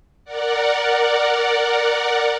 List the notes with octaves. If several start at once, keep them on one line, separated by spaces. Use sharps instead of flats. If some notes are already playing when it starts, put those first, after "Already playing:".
A#4 D5 F#5